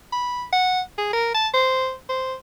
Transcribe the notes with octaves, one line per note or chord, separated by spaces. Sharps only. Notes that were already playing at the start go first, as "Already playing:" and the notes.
B5
F#5
G#4
A#4
A5
C5
C5